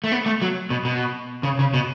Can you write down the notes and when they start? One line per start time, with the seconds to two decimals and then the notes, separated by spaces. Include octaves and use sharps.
0.04 A3
0.12 B3
0.26 A3
0.42 F#3
0.70 B2
0.85 B2
1.43 C#3
1.59 C#3
1.74 B2